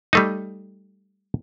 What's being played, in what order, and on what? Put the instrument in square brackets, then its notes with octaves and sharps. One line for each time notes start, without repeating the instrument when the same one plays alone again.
[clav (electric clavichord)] G3 A3 D#4